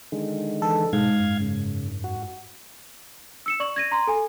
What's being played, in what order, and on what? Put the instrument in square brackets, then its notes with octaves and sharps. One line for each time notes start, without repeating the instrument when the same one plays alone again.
[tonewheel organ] D3 D#3 G#3
[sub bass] E3 [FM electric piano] A4
[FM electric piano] G#2 [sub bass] B2 [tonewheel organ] F5 G#6
[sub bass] F#2
[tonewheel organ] C#3
F#4
[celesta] E6 C#7 E7
D5 C#6 F#7
G#6 A#6 D#7
A#5 C6
A4 G#5